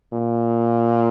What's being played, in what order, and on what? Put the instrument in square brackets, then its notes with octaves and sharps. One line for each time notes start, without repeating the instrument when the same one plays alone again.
[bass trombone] A#2